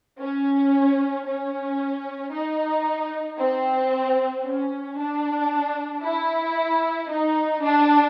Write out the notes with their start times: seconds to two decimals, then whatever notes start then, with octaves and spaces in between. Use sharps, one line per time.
0.21 C#4
1.26 C#4
2.33 D#4
3.38 C4
4.44 C#4
4.98 D4
6.03 E4
7.10 D#4
7.63 D4